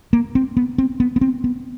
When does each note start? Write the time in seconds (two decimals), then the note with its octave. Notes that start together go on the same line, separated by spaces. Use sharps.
0.13 A#3
0.35 C4
0.57 B3
0.78 C4
1.00 B3
1.16 B3
1.21 C4
1.44 B3